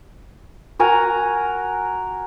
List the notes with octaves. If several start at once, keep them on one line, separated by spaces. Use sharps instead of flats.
F#4 A#4 G#5 A#5